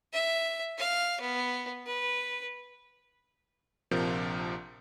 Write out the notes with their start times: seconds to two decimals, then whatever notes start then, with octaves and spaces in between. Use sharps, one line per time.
0.13 E5
0.78 F5
1.21 B3
1.86 B4
3.91 A#1 C3 F3 F4 A#4 G6